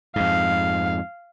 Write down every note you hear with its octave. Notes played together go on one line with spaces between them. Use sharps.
F2 G#2 F5